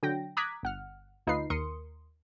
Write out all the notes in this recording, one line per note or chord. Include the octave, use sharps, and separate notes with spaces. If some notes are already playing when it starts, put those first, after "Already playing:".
D3 F#3 G5 A#6
A#5 D6 D#6 F#6 G#6 B6
G1 F#5 F6
D2 D#4 F4 B4 C7
D#2 A#4 C6 D#6 C#7